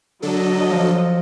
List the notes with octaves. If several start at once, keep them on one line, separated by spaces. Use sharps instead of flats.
D3 F#3 D4 A4 D#5
F3